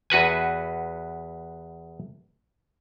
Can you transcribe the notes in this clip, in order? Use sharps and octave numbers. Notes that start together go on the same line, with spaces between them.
E2 F#4 B4 G#5